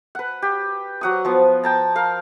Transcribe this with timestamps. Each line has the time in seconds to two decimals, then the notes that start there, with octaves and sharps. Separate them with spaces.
0.15 B4 F#5
0.42 G4
1.01 F#3 F#5 D#6
1.25 F3 B3
1.64 G5 A5 A#5
1.96 A#4 F5